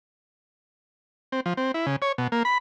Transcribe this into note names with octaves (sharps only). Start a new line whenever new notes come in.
C4
F3
C4
E4
C#3
C#5
B2
A#3
B5